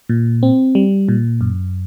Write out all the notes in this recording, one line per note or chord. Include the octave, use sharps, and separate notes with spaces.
A#2
C4
G3
A#2
F#2